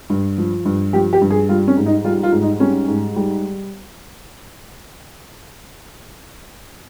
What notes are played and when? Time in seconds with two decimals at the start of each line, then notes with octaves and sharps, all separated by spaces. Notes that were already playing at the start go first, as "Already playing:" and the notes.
0.10 G2
0.38 F3
0.65 G2
0.93 F3 G4
1.13 G4
1.21 G2
1.31 G#4
1.49 G3 F4
1.68 C#4
1.77 G#2
1.86 D#4
2.05 G3 F4
2.23 F4
2.32 G#2
2.42 D#4
2.60 G3 C#4
2.88 G#2
3.16 G3